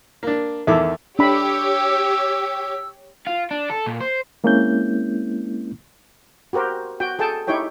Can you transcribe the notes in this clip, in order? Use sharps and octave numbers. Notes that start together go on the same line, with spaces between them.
A#3 D4
E2 D#3 A4 E5 D6
D4 G4 C#5 B5 E6
F4
D4
A4
A#2
C5
G#3 A#3 C4 C#4 E4 G6
F#4 G4 A#4 C5
F#4 G5
G#4 A4 G5 A5
D#4 E4 G4 C#5 G5